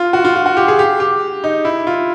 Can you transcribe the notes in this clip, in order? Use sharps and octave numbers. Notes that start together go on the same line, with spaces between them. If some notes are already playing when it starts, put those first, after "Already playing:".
Already playing: F4
F#4
F4
F4
F#4
G4
G#4
G4
G4
D#4
E4
F4